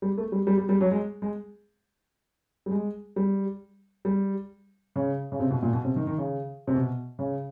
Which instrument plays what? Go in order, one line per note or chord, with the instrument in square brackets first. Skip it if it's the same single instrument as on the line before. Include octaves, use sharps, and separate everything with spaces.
[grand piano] G3
A3
G3
G3
G3
G3
F#3
G#3
G#3
G3
G#3
G3
G3
C#3
C#3
C3
B2
A#2
B2
C3
D#3
D#3
C#3
C3
B2
C#3